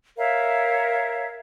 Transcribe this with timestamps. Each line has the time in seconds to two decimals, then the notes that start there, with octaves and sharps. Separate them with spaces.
0.18 A#4 C#5 E5 F5